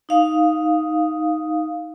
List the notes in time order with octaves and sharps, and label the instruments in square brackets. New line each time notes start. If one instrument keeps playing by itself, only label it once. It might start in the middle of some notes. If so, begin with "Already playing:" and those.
[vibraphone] D#4 F5 D#6